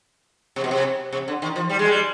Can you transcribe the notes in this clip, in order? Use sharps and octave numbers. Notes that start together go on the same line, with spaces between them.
C3
B2
C3
C3
D3
D#3
F3
G3
G#3
G3